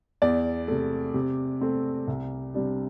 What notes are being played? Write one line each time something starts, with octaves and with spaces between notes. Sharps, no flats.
E2 D5
C3 A3
C3
A3 C4
C2
C3 G3 D4